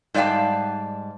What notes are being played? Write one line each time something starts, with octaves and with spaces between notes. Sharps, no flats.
G#2 G3 D5 F5 G5 A5